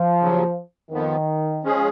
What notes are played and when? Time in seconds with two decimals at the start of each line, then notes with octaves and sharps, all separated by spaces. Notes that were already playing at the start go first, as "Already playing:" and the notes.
Already playing: F3
0.19 D#2 C#3 F#3
0.90 F2 D#3 F3 B3
1.63 F3 G#3 C#4 G#4